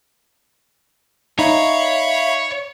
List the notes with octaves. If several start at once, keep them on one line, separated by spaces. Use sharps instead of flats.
D#4 C#5 E5 F5 B5